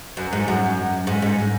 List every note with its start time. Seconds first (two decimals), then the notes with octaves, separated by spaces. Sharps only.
0.17 F#2
0.33 G#2
0.48 F#2
1.07 G#2
1.22 G#2